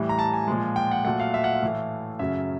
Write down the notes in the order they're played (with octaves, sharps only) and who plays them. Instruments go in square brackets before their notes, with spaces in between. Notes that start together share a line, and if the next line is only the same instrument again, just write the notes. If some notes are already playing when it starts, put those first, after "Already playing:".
Already playing: [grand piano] A2 E3 G3
A#5
A5
G#5
A#2 F3 G#3
G5
F#5
A#2 F#3 A3 F#5
F5
E5
F#5
F5
A2 E3 A3
F#2 C#3 F#3 A3 E5